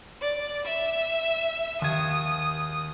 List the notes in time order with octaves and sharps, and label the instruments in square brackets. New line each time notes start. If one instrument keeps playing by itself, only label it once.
[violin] D5
E5
[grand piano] D#2 G#6 [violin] D#6